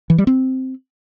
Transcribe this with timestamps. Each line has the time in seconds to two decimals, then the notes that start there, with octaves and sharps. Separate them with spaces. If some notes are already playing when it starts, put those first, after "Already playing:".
0.10 E3
0.18 G3
0.27 C4